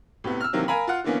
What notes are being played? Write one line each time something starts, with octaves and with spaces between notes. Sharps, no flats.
A2 C3 B3
E6 F6
C3 D#3 E3 F#3 A#3 C4
A#4 F5 G#5 A#5 B5
F4 F#5
D3 E3 A#3 B3 C#4